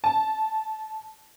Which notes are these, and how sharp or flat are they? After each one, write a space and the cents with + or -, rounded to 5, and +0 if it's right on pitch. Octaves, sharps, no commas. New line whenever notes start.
A5 -15